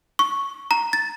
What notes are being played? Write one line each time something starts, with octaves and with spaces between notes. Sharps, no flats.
C#6
A#5
A6